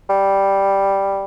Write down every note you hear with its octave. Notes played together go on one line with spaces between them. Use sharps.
G3